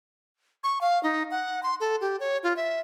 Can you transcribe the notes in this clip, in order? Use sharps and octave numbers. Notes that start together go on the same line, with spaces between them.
C#6
F5
D#4
F#5
C6
A4
G4
C#5
F4
E5